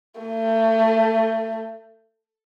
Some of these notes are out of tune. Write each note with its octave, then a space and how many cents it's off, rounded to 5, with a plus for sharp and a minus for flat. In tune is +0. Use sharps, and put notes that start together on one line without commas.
A3 +30